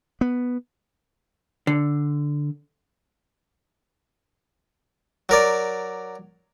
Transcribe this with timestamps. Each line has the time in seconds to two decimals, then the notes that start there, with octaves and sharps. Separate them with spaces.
0.21 B3
1.67 D3
5.29 F#3 A#4 D5